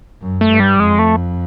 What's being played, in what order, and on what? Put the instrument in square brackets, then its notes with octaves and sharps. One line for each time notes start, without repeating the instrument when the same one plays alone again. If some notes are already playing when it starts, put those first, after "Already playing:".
[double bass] F#2
[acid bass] A3
[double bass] G2
[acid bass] G3
[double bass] F2 [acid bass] G#3
[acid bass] A3